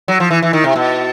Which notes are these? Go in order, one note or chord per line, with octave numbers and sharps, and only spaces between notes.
F#3
F3
E3
E3
D#3
C3
B2